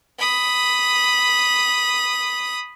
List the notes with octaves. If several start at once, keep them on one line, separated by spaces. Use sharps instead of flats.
B5 D#6